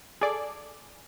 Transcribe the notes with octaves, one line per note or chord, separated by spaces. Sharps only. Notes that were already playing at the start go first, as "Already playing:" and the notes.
G#4 A4 D5